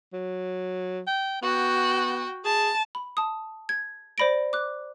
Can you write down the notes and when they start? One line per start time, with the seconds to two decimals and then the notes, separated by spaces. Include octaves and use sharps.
0.13 F#3
1.07 G5
1.42 B3 F#4 G5
2.45 G#4 A5
2.95 B5
3.17 A5 D#6
3.69 G#6
4.18 C5 D5 B5 A#6 D7
4.53 D6 F#6